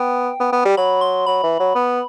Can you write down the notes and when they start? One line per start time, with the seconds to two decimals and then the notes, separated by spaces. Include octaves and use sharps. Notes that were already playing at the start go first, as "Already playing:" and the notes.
Already playing: B3 G5
0.40 B3
0.53 B3
0.65 G3
0.77 F#3 B5
1.01 C6
1.27 F#3 B5
1.43 E3
1.60 F#3
1.75 B3